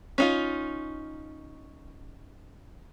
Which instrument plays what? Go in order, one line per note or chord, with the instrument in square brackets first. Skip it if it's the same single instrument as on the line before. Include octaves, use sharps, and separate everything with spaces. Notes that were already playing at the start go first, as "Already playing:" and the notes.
[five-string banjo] C#4 D#4 F4